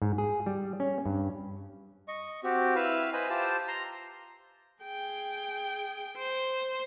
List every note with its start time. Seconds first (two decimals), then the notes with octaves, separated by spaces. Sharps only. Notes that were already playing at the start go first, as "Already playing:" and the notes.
0.02 G#2
0.18 G#4
0.46 G3
0.80 C#4
1.06 G2
2.08 D#5 C#6
2.44 C4 F#4 G4
2.76 E4 B4 E5 F5
3.13 B4 C5 D#5 G#5 B5
3.30 F4 G4 C5 A5 E6
3.68 A#5 C6
4.83 G#4 G5
6.17 C5